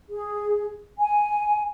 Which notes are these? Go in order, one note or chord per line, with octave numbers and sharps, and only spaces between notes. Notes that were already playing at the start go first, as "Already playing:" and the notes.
G#4
G#5